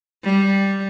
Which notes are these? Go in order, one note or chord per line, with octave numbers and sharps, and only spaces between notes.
G3